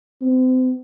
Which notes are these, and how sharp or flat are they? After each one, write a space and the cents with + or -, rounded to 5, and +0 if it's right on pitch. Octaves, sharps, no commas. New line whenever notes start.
C4 -35